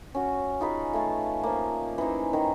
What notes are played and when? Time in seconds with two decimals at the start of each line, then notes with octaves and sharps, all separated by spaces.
0.15 C#4 F#4
0.61 D#4 F4 G#4 B4
0.93 A3 F5 G#5 A5
1.43 F3 A#3
1.98 E3 C#4 D#4 C5
2.33 D#3 A#5